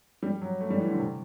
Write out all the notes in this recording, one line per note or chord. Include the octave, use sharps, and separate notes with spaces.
G3
F#3
A3
G3
E3
D3
C3